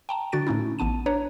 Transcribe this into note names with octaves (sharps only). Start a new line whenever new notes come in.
G5 A5 A#5
D3 D4 F#4 A6 D7
A2 A3 C#4 D#4 E4
A1 B3 A5 D#7
D4 B4 C#5 A#5